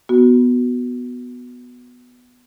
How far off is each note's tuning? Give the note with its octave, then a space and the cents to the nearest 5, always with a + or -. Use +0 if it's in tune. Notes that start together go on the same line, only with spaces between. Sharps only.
B3 +0 F#4 +0